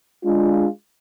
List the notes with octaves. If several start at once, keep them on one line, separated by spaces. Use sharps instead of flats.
G#3 D4 F4